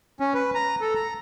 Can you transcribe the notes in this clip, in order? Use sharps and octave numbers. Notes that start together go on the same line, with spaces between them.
C#4
B4
A#5
A4
A#5